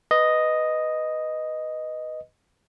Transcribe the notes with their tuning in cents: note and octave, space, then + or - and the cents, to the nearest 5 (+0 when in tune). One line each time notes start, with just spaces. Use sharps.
B4 +0 D#5 +0